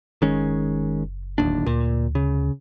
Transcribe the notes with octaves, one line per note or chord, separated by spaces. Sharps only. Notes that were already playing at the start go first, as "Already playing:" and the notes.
F#1 D#3 G#3 C#4
D1 D#2 D4
D2 A#2
C#3